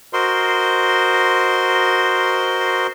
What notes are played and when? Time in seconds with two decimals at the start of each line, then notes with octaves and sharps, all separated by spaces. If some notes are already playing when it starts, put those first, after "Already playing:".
0.13 F#4 A#4 C5 D#5 C6